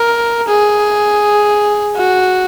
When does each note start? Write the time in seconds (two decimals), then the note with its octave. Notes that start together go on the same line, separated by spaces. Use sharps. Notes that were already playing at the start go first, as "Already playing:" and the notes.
Already playing: A#4
0.48 G#4
1.97 F#4